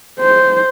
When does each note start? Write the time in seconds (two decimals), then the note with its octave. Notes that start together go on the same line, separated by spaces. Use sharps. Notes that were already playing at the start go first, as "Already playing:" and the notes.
0.20 C5